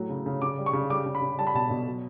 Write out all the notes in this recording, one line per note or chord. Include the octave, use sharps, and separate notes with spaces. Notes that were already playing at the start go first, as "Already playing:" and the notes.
Already playing: A2 F#3
C#3
C#3
C#3 D6
G3
C#6
C#3
G3 D6
C#3
B5
C#3
G3 A5
B5
B2 A5
B2
F#3